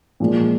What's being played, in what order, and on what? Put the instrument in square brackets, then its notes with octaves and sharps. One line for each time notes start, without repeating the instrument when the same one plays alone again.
[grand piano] A#2 F3 G#3